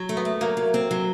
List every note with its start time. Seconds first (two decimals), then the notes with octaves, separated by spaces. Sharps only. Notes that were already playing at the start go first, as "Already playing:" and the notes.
Already playing: F#3
0.09 A3
0.17 B3
0.25 A3
0.41 F#3 A#3
0.57 F#3
0.74 C4
0.91 F#3